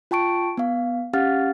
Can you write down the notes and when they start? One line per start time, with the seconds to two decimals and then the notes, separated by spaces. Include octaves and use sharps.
0.11 F4 G5 A5 C#6 D7
0.57 B3 F5
1.13 C#4 G4 F5 F#5 F6 A6